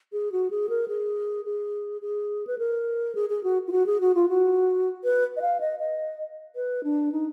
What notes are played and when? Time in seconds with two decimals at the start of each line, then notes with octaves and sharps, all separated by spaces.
0.13 G#4
0.32 F#4
0.51 G#4
0.69 A#4
0.88 G#4
1.45 G#4
2.02 G#4
2.47 B4
2.58 A#4
3.15 G#4
3.29 G#4
3.44 F#4
3.68 F4
3.72 F#4
3.86 G#4
4.01 F#4
4.15 F4
4.29 F#4
5.04 B4
5.37 D#5
5.42 F5
5.61 D#5
5.80 D#5
6.56 B4
6.84 D4
7.12 D#4